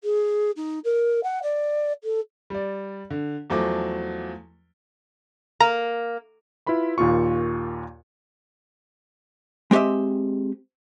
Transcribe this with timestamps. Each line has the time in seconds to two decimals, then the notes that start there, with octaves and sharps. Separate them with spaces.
0.04 G#4
0.56 D#4
0.84 A#4
1.23 F#5
1.42 D5
2.04 A4
2.50 G3 D5
3.10 D3
3.50 E2 F3 F#3 A3 D6
5.60 A#3 A#5
6.66 E4 F4 B4 B5 C6
6.98 D#2 A#2 A#3 F4 C#6
9.71 G#3 C4 G4 D#5 E5